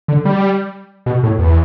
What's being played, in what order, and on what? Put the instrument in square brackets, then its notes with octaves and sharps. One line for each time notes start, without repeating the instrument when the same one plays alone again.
[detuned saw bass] D3
G3
B2
A2
E2